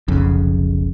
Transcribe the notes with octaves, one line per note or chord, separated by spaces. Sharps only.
F1 B1 F2 C#3